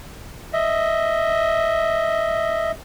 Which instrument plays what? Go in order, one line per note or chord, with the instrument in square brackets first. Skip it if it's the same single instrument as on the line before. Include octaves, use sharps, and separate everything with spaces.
[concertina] D#5 E5